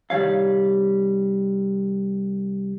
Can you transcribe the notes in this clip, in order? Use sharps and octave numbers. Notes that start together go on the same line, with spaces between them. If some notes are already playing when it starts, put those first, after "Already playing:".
C2 D#3 G3 C#5 F5